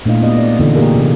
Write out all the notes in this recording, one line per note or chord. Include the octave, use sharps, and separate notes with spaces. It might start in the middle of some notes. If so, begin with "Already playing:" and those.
A#2 A3 D4 E4 D#5 F5
B3 E4 F4 G4 D5 D#5
D5
D3 E3 C4 D#4 F4 A4
A#3 D4 G4 G#4 A#4
C3 E3